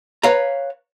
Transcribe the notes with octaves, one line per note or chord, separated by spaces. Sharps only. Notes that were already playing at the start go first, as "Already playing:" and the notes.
B4 C#5 F5 A#5